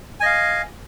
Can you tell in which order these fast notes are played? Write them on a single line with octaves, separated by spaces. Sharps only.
G#5 D#5 F5